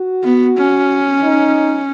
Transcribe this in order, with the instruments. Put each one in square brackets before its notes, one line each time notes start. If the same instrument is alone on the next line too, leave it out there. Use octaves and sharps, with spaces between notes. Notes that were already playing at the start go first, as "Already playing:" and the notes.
Already playing: [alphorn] F#4
[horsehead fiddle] B3
C#4
[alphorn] D#4